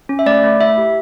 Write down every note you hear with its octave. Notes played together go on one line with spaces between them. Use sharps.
C#4
E5
A3 D5
A3
E4 E5
G4